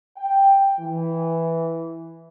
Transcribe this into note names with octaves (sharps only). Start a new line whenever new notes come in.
G5
E3